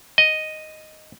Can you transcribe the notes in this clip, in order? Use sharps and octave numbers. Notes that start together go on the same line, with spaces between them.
D#5